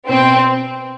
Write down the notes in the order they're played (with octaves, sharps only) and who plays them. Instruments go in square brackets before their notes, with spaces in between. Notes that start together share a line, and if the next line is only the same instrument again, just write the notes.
[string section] B2 C4